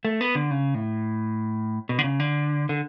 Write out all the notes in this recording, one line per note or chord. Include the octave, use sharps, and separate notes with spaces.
A3
B3
D3
C#3
A2
B2
D3
C#3
D3
D3